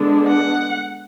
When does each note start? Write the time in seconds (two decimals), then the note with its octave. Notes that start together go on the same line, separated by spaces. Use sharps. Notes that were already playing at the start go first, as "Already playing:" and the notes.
Already playing: D3 G#3 B3 D4
0.28 F#5